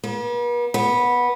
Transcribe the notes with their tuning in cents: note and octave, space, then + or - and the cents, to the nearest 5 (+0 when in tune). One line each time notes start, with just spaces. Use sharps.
B3 -45
B3 -15